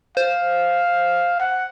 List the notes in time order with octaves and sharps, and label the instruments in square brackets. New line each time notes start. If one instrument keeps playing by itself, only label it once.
[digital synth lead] C5 [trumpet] F5
[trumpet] F#5